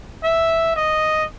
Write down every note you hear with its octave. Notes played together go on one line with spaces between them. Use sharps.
E5
D#5